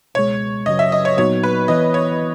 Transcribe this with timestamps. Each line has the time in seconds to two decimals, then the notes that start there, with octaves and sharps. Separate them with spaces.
0.15 C#2 B2 G#3 C#5
0.66 F#2 C#3 F#3 D#5
0.79 E5
0.92 D#5
1.05 C#5
1.17 A#2 F#3 B3 D#4 F#4 C#5
1.43 B4
1.68 E3 B3 E4 B4 D#5
1.94 C#5